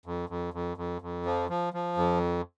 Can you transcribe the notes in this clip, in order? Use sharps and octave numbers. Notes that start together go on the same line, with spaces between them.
F2
F2
F2
F2
F2
F3
F3
F3
F2